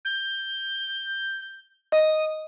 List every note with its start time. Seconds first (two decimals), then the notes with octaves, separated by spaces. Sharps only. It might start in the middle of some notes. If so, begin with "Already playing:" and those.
0.05 G6
1.92 D#5 D#6